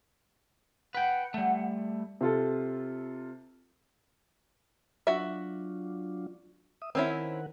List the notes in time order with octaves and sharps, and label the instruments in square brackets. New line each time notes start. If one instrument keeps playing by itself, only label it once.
[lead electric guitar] B4 G5 [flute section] F#5
[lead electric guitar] G3 A3
[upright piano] C3 F4 A4
[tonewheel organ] F#3 D4 F4 [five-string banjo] F#4 E5
[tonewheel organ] E5 D#6
[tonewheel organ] D#3 A#4 F#5 [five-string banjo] C4 C#4 E4